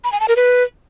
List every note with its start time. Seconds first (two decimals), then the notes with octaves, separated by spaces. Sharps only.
0.04 B5
0.12 G#5
0.20 A5
0.28 A#4
0.36 B4